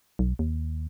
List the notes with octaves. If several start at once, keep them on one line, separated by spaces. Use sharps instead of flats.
B1
D#2